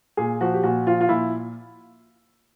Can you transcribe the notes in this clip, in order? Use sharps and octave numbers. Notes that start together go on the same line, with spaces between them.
A#2 G#4
F3 F#4
G4
A#2 F#4
F3 F4
F4
A#2 E4